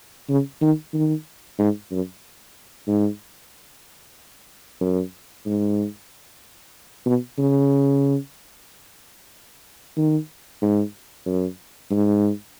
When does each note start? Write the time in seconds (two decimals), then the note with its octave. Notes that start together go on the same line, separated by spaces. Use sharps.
0.29 C#3
0.61 D#3
0.94 D#3
1.59 G#2
1.91 F#2
2.88 G#2
4.81 F#2
5.46 G#2
7.06 B2
7.38 C#3
9.97 D#3
10.62 G#2
11.26 F#2
11.91 G#2